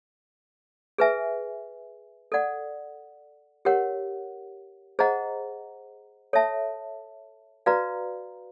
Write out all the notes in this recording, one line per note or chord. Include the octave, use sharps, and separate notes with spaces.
G#4 B4 E5 G#5
A4 D5 F#5
G4 A#4 C#5 F#5
G#4 C5 D#5 F#5 A#5
A4 C#5 E5 A5
F#4 B4 D5 F5 A#5